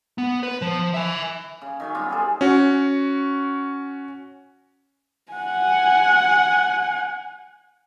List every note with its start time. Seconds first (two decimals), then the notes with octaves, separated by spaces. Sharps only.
0.18 B3
0.43 B4
0.62 F3
0.94 E5 G#5
1.62 C#3
1.80 D#3 F#3 C#4
1.95 G3 B3 F4
2.09 E4 G#4 A4 C5
2.41 C#4 F#4
5.32 F#5 G#5